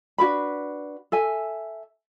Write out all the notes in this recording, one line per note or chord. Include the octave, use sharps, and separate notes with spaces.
D4 F#4 B4 B5
A4 E5 G#5